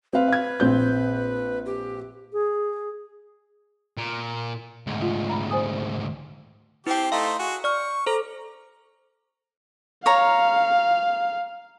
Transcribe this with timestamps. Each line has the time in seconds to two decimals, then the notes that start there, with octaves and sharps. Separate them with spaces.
0.13 C4 B4 F5
0.28 F5 G#6
0.60 A#1 C4 G6
1.66 G4
2.33 G#4
3.98 A#2
4.87 D2 G#2
5.02 F4
5.29 A#5 B5
5.51 C5 G#5 D#6
6.87 C4 E4 G4 G5
7.12 A3 D#4 C5 F5
7.39 F#4 G#4
7.64 D5 C#6 F6
8.06 A4 C5 A#5
10.06 C#5 F5 A#5